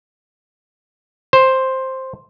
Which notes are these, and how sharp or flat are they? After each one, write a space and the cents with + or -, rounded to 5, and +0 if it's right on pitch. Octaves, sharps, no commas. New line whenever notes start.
C5 +5